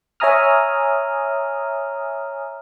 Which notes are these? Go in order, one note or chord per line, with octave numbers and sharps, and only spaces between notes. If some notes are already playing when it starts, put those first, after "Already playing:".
C#5 E5 G#5 A#5 D#6 F6